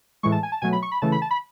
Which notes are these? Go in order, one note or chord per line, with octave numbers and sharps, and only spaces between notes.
A2 E3 G#3 C#6
A5
G#5
A5
B2 F#3 A3 G#5
B5
C#6
B5
C#3 E3 A3 A5
B5
A5
B5